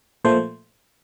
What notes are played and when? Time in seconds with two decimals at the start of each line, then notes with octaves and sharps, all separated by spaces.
0.25 A#2 F3 A3 C5